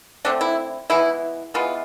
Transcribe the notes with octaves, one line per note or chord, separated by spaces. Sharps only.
D3 A3 C4 D4
E4
E3 G#3 B3 E4
E3 G#3 B3 F4